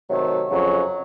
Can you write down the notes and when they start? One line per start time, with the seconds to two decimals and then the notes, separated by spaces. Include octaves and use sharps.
0.09 C3 D#3 F#3 A3
0.50 F2 C#3 F#3